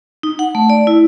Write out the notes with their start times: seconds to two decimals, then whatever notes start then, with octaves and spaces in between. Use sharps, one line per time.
0.23 D#4
0.39 F#5
0.55 A3
0.70 D5
0.87 E4